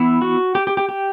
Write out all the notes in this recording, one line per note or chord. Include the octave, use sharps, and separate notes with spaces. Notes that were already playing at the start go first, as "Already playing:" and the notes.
Already playing: E3 B3 E4
F#4
G4
G4
G4
G4